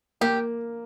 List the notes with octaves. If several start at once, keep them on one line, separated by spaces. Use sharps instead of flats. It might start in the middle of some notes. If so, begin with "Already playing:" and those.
A#3 G4